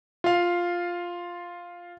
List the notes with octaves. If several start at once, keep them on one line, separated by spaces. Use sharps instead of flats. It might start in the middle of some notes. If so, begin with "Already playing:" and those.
F4 F5